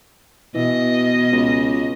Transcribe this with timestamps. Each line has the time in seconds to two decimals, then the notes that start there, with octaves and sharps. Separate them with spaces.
0.54 B2 E3 D#5
1.32 C#2